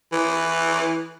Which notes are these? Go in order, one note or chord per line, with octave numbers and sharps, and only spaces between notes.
E3